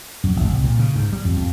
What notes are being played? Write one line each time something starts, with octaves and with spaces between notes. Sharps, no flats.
F#2
A1
C2
A#2
C#3
G#2
G3
F2
F2